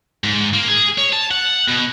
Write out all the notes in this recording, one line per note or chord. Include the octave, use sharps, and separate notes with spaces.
G#2
A#3
G#4
C#5
A5
F#5
B2